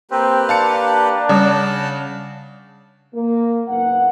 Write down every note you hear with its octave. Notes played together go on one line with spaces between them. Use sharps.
A#3 C4 G4 B4
D4 F5 A5 C#7
C#3 G3 D5 F#5 A5
A#3
F#1 G#2 B3 F5 F#5